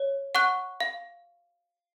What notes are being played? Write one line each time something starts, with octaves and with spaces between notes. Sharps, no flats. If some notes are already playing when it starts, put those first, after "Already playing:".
Already playing: C#5
F#5 C#6 F#6
F5